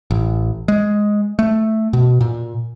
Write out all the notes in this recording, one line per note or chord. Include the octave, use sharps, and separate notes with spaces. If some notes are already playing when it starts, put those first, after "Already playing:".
A1
G#3
A3
B2
A#2